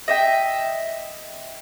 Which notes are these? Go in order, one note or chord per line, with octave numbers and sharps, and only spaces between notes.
D#5 E5 G5